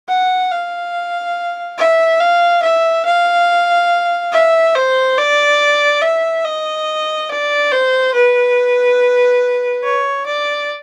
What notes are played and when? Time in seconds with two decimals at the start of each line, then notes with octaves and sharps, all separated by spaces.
0.08 F#5
0.51 F5
1.78 E5
2.20 F5
2.63 E5
3.05 F5
4.32 E5
4.75 C5
5.18 D5
6.02 E5
6.45 D#5
7.29 D5
7.72 C5
8.14 B4
9.84 C#5
10.26 D5